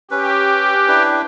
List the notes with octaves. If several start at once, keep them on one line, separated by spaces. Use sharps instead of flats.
C#4 G4 B4
D4 E4 B4